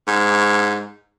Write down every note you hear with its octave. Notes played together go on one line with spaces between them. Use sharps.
G#2